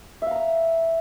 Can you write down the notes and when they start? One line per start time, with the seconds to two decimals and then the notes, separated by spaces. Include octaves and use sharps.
0.22 E5
0.26 F5
0.31 A#5
0.36 E6